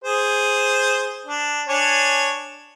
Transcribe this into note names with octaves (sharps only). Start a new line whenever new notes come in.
G#4 C5
D4
D4 C#5 G#5